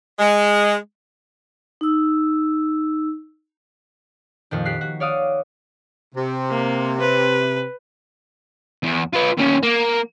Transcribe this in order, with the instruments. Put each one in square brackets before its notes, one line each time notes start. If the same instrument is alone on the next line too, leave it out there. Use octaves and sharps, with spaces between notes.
[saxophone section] G#3
[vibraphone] D#4 E6
[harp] F2 A#2 D#3
G4 F#6 B6 C7
F#4
C#5 D5 F5 D#6
[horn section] C3
[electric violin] A#3
B4
[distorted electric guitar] E2
F4 B4
D#2 C#4
A#3